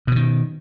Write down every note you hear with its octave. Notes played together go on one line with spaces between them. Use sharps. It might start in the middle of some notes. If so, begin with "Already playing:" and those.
B2 D3 D#3